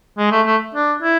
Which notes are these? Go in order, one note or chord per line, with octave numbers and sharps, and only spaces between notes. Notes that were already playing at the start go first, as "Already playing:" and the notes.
G#3
A3
A3
D4
E4